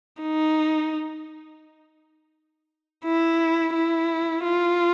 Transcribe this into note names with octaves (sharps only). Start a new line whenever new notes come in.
D#4
E4
E4
F4